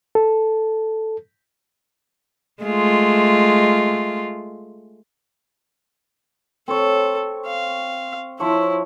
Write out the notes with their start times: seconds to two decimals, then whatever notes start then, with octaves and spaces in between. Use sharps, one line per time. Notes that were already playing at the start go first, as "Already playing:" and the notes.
0.15 A4
2.63 G#3 A3 F4
6.68 C4 A4 C#5
7.47 F5
8.40 F3 E4 C5 C#5